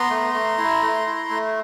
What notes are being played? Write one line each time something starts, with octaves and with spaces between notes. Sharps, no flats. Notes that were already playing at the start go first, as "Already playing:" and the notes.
Already playing: B3 A#5 C6
A3
A3
E4
A3
E4
A3